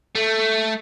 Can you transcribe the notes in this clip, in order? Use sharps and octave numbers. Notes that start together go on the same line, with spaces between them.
A3